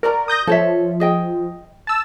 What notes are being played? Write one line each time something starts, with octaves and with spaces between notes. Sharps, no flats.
F#4 A#4 D5 A#5
D#6 G6 A#6
F3 A4 C#5 E5
G#4 D#5 G5
A5 E6